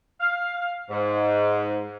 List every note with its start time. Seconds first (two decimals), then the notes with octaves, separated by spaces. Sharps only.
0.21 F5
0.90 G#2